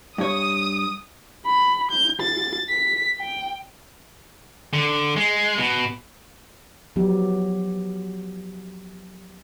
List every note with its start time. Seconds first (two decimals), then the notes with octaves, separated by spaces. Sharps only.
0.18 G2 C#5 D#6
1.46 B5
1.92 G6
2.21 A6
2.70 B6
3.21 G5
4.73 D3
5.16 G#3
5.59 B2
6.96 F3 F#3 B3 G4